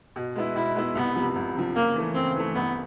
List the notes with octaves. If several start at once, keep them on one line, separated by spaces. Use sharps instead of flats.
B2
G#3 B3 E4
B2 E4
G#3 B3 E4
C2 B3
C3 F3
C2
C3 F3
C#3 A#3
E3 A3
C#3 C4
E3 A3
C2 B3